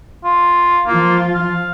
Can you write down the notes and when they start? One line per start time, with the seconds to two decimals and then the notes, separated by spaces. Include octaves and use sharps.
0.24 F4
0.87 F3 A#3 F4
1.34 F5